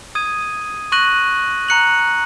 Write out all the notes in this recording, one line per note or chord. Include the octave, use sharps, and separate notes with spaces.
D#6 G#6 D#7
C#6 F#6 A#6 D#7 F#7
A#5 F#6 C#7 F#7